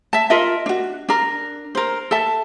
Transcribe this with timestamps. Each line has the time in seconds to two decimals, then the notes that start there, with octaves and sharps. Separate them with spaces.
0.13 E5 A5
0.30 F4 A#4 D#5 E5
0.66 D4 F#4
1.09 D4 A#4
1.75 A#4 C5
2.11 A4 E5 A5